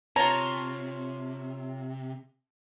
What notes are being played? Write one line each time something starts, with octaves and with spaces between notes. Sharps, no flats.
C3 F4 C#5 A5 A#5